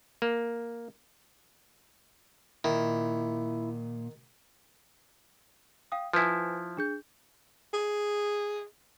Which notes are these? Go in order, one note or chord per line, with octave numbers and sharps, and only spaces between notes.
A#3
A#2 D#3 E4
F5 G5 D#6
F3 E4 B4 C5 G#5
D4 G#4 G6
G#4